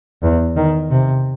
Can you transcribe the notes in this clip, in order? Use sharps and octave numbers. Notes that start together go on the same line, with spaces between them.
E2
D#3
C3